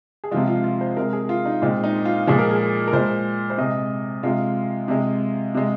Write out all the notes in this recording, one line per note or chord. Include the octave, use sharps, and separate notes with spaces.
G#4
C3 F3 G#3 F4
F4
F4
C5
C3 G#3 A#4
G#4
F4
D#4
A#2 G#3 C4
D#4
F4
A#2 F3 G#3 G#4
A#4
G#4
A#4
A#2 G#3 C5
C5
C3 G#3 D#5
C3 G#3 F4
C3 G#3
C3 G#3